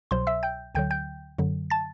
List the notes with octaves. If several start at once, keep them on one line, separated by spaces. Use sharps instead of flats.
C2 B2 F#3 C5 C6
E5 E6
G5 G6
D2 D3 F#3 G5 G6
G5 G6
F#2 D3 F#3
A5 A6